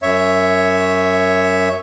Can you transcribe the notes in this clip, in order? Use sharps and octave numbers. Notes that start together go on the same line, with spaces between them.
F#2 C#5 E5